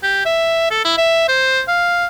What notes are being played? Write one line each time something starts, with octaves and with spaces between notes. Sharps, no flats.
G4
E5
A4
E4
E5
C5
F5